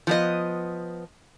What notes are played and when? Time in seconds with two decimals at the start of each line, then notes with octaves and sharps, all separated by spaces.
0.07 F3 B3 D#5